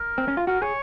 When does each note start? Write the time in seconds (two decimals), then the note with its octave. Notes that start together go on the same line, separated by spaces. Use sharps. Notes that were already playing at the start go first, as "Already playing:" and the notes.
Already playing: A#4
0.18 C4
0.28 C#4
0.37 F4
0.47 F#4 A#4
0.62 G#4 C#5